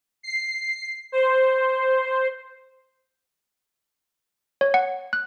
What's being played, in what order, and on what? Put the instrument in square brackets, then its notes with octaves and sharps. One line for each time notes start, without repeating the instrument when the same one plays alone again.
[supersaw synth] C7
C5
[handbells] C#5
F#5
F#6